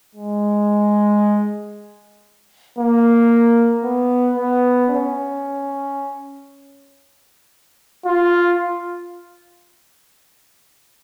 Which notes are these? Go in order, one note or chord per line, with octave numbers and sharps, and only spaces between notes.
G#3
A#3
B3
B3
C#4
F4